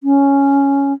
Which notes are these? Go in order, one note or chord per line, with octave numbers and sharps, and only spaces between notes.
C#4